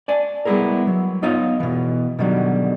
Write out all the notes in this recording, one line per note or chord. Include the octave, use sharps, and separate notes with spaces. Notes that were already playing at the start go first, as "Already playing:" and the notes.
D5 G#5 A5
G3 G#3 B3 E4 G#4 A#4
F#3
B3 D#4 F4 C#5 D#5 F5
B2 E3
B2 D3 D#3 F#3 G3